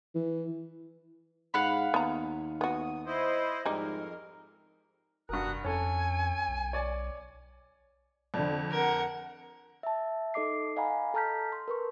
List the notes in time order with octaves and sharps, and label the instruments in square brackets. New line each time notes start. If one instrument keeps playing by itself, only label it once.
[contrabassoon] E3
[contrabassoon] G#2 [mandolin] F5 F#5 B5
[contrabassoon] D#2 [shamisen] B3 A#5
[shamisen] B3 F#4 [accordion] D#6
[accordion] E4 C5 D#5
[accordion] F2 A#4 [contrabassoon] G#2 [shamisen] G3 D#4
[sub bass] F1 [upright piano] G2 A#4 [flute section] F#4 D#6 F#6
[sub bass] F2 [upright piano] C#4 A4 [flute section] G#5
[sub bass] B1
[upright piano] C#5 D5
[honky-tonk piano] F2 [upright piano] D3 D5
[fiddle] A#4 F#5
[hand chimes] E5 A5
D#4 A4 D#5 D6 C7
D#5 F5 F#5 G#5 A#5 B5
A4 A5 A#5 F6 G6 B6
C6
A#4 B4 C#6